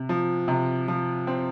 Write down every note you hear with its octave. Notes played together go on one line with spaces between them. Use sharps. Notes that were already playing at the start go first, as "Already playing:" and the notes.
Already playing: C3
F3
C3
F3
C4